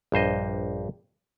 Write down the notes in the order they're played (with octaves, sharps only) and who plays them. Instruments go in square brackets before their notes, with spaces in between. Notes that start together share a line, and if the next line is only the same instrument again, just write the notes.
[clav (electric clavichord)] A#1 G2 C5 D#5